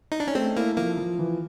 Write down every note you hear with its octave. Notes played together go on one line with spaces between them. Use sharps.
D#4
D4
C#4
A3 C4
A#3 E4
F3 A#3
F3
E3